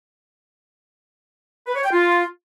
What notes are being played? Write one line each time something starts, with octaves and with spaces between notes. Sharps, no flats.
B4
C#5
G5
F4